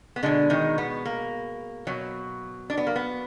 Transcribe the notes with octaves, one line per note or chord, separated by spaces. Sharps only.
B3
B2 D3 G#3 D4
D#3 D#4
B3
A#3
B2 F#3
D4
B3
A#3
B3